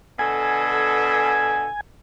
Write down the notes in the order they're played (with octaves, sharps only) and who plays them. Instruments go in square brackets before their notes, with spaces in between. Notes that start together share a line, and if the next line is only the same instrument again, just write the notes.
[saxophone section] B2 D3 A4 [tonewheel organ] G#5